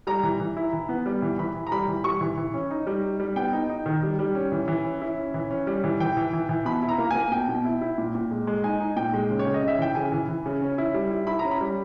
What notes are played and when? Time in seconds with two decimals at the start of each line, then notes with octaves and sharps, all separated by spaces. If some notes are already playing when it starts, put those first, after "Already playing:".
0.07 G3 A#5
0.23 E3
0.40 E3
0.57 E4
0.73 E3
0.89 B3
1.06 G3
1.22 E3
1.38 E3 B5
1.55 E3
1.67 A#5
1.72 G3 B5
1.88 E3
2.04 G3 C#6
2.21 E3
2.38 E3
2.54 C#4
2.71 D#4
2.87 G3
3.03 D#4
3.20 G3
3.36 B3 G5
3.53 D#4
3.69 D#4
3.86 D#3
4.03 G3
4.19 G3
4.35 C#4
4.52 E3
4.68 E3
4.85 C#4
5.01 E4
5.17 C#4
5.34 E3
5.51 C#4
5.67 G3
5.84 E3
6.00 E3 G5
6.17 E3
6.33 E3
6.49 E3
6.65 B2 B5
6.82 E4
6.89 A#5
6.98 A#3
7.11 A#3 G#5
7.32 B2 G5
7.49 B2
7.65 E4
7.81 E4
7.98 A#2
8.15 A#2
8.31 G#3
8.47 G#3
8.64 D#4 G#5
8.80 D#4
8.97 A#2 G5
9.13 G#3
9.29 C#3
9.39 C#5
9.47 C#3
9.54 D#5
9.63 C#3 E5
9.79 E3 G5
9.95 C#3 G#5
10.12 E3
10.28 E3
10.46 C#3
10.62 C#4
10.78 E4
10.94 G3
11.11 E4
11.27 E4 B5
11.39 A#5
11.44 C#4
11.51 B5
11.61 G3